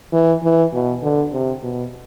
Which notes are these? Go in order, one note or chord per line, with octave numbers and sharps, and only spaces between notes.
E3
E3
B2
D3
C3
B2